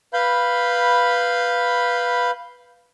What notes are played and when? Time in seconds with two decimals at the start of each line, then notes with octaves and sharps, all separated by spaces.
0.13 B4 F5 B5 G6